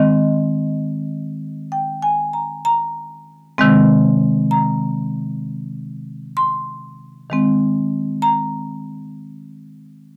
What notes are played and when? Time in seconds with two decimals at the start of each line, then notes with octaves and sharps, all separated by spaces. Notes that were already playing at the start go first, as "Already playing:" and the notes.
Already playing: D#3 G#3 C4 D#5
1.72 G5
2.02 G#5
2.33 A#5
2.65 A#5
3.58 C3 D#3 G#3 C4
4.51 A#5
6.37 C6
7.30 D#3 G#3 C4
8.22 A#5